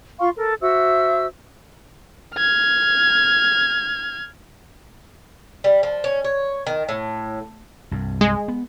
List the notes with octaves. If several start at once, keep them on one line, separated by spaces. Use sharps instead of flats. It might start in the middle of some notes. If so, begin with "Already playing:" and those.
F4 F5 C6 C#6
A4 A#4
F#4 C5 E5 E6
F6 G#6
G3
F3
C#4
C#5
D#3
A2
C2 G2
G#3
B3